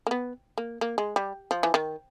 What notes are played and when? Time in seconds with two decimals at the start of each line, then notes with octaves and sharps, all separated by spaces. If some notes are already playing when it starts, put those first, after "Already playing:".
0.07 A#3
0.11 B3
0.58 A#3
0.81 A#3
0.98 G#3
1.16 G3
1.51 F3
1.63 E3
1.74 D#3